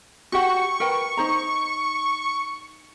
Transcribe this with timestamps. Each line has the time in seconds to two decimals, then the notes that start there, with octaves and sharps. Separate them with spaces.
0.32 F#4 G4 F#5 C#6
0.80 A#4 B4 G5
1.17 D#4 C5 A#5